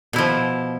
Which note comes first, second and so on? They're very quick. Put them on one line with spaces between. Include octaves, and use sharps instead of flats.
B2 E4 F3